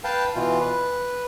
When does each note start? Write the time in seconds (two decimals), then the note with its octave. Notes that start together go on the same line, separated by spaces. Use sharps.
0.04 B4 F5 G5 A5
0.35 B2 E3 F4
0.61 B4